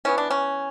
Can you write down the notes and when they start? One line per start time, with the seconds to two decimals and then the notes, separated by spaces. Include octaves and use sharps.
0.05 E3 B3 C#4
0.18 D4
0.31 C#4